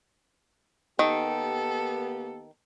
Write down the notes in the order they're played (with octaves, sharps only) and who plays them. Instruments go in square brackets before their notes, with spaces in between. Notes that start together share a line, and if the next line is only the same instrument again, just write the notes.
[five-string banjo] D#3 [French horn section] A#3 B3 G4 [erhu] A4